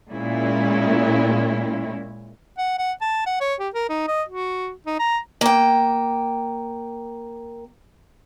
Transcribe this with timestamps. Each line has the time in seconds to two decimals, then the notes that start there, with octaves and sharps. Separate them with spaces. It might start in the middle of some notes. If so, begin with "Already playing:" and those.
0.10 A#2 G#3 C#4 E4
2.58 F#5
2.78 F#5
3.01 A5
3.26 F#5
3.41 C#5
3.60 G4
3.74 A#4
3.89 D#4
4.07 D#5
4.29 F#4
4.87 D#4
4.99 A#5
5.41 A#3 G5